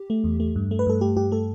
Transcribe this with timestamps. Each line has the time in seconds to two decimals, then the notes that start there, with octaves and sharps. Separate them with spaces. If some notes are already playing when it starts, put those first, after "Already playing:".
Already playing: G4
0.10 A3
0.24 E2
0.40 A3
0.56 G2
0.71 A3
0.79 B4
0.87 G2 A4
1.01 A3 G4
1.16 G2 G4
1.31 A3 A4